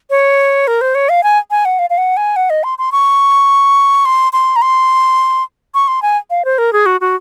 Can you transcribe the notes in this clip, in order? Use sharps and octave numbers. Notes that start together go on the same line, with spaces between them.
C#5
A#4
C5
C#5
F5
G#5
G#5
F#5
F5
F5
F#5
G#5
F#5
D#5
C6
C6
C#6
C6
C6
A#5
C6
C#6
C6
G#5
F5
C5
A#4
G#4
F#4
F#4